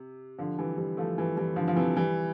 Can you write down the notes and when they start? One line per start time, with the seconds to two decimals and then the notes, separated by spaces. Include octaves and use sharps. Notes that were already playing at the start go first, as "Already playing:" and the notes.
Already playing: C3
0.38 D3 F3
0.58 E3 G3
0.78 E3 G3
0.97 F3 A3
1.18 E3 G3
1.37 E3 G3
1.56 D3 F3
1.68 F3
1.76 C3 E3
1.97 E3 G3